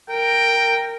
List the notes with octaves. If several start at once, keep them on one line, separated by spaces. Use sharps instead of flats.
A#4 G5